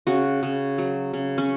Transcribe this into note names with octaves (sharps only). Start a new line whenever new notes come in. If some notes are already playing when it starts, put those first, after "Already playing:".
C#3 F#4
C#3
F#3
C#3
C#4